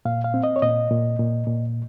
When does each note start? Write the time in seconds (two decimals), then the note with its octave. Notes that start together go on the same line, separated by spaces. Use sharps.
0.05 A#2 F5
0.24 F5
0.34 C4
0.44 D#5
0.56 C#5
0.62 A#2 D#5
0.90 A#2
1.19 A#2
1.47 A#2